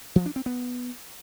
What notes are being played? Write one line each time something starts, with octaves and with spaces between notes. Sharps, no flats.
F3
D4
C4
B3